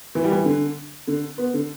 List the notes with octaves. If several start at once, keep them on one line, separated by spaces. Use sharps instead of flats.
E3
G3
E3
D3
D3
B3
D3